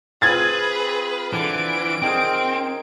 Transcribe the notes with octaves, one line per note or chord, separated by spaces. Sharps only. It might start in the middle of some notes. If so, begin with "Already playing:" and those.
C4 F4 G#4 B4 G#6 A6
D3 E3 D5 D7
D#3 C4 G#4 A#4